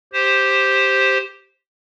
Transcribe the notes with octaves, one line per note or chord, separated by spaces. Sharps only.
G4 C5